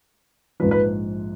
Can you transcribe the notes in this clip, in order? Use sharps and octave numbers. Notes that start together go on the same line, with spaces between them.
A#1 G#2 F3 B4
B4